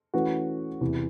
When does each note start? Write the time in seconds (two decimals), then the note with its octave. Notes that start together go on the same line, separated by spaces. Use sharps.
0.14 E3 A3 C#4 F#4 B4
0.81 E2 C3 E3